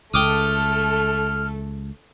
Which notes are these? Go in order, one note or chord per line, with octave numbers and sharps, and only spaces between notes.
C#2 A3 A4 G5 D6 D#6 F6